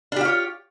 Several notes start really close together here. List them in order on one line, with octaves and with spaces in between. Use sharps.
D4 G4 F4 C#5